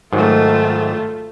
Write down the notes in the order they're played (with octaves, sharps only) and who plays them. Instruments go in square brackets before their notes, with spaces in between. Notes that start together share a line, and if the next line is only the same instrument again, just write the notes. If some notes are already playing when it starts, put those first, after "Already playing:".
[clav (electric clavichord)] G#2 D#3 F#3 [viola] A3 F4